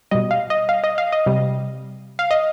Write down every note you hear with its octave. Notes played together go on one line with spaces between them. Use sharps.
B2 G3 D#5
F5
D#5
F5
D#5
F5
D#5
C3 G3
F5
D#5